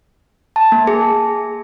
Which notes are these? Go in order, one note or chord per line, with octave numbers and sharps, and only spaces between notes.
A5
A#3
G#4